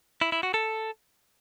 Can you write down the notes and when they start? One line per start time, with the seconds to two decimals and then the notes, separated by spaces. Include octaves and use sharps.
0.21 E4
0.32 E4
0.43 F#4
0.54 A4